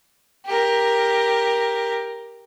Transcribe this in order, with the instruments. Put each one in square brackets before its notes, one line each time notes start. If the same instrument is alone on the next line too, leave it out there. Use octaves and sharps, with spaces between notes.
[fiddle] G4 A#4